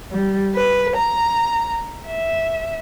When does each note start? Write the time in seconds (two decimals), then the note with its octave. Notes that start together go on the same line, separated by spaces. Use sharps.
0.12 G3
0.54 B4
0.95 A#5
2.07 E5